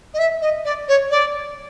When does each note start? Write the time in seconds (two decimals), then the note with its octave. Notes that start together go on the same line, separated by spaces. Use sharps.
0.14 D#5
0.19 E5
0.41 D#5
0.65 D5
0.88 C#5
1.11 D5